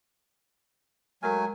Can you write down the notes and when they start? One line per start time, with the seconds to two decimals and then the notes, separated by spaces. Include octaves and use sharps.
1.23 F#3 G#3 A3 A#4 G#5 F6